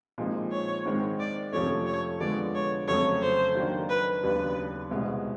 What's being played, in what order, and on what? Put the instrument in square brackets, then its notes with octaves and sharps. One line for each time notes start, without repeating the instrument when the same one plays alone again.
[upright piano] A#2 F3 G#3 C4 D#4
[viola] C#5
[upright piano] G#2 D#3 G#3 C4
[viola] D5
[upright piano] F2 C3 F3 A3 C#4 [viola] C#5
[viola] C#5
[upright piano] D3 F3 G#3 B3 [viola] D5
[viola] C#5
[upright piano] F2 C#3 F#3 A3 C4 [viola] C#5
[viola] C5
[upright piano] D#3 F#3 A#3 D4
[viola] B4
[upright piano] D#2 C#3 F#3 B3 D4 [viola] B4
[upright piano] C2 B2 G#3 C4